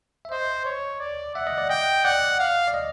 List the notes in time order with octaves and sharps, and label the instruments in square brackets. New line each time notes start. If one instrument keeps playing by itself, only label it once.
[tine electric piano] E5
[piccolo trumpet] C5 [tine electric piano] D#5
[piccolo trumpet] C#5
D5
[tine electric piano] E5 [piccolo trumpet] F#5
[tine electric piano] D#5
D5
[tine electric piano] D#5 [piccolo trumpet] G5
[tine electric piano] D5 [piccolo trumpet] F#5
[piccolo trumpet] F5
[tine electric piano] D5
D#5